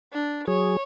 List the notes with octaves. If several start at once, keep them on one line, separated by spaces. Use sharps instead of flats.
D4
F#3 G#4 C#5